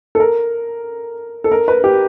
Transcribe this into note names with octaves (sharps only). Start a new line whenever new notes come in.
A4
A#4
A4
A#4
B4
G4